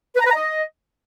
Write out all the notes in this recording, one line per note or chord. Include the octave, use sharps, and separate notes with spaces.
B4
A#5
B4
A#5
D#5